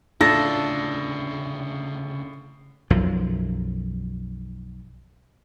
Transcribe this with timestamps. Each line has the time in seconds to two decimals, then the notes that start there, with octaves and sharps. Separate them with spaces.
0.21 D2 A2 C#3 D4 F4 A4 A#6
2.90 B1 F#2 F3